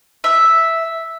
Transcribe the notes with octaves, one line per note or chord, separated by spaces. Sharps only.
E5